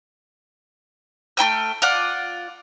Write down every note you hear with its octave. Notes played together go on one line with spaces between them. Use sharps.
A3 E4 G5 F6
F4 D5 F#5